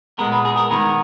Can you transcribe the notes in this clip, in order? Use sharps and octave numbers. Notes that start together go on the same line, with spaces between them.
A#2 G#3 B3 A#4
B4
G#4
A#4
D#3 G#3 B3 A#4